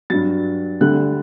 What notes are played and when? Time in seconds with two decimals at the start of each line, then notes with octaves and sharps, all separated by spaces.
0.10 G2 F#3 A6
0.81 D2 D3 G3 F#6